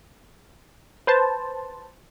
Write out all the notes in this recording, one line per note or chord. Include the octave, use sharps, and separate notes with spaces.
B4 C5 A5